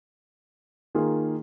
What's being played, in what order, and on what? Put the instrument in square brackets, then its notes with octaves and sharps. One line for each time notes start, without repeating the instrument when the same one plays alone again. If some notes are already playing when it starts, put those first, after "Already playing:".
[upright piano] D#3 A#3 F4 G#4